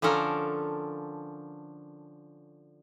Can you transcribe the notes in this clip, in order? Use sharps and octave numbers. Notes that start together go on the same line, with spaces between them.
D3 F3 C#4 A4 A#4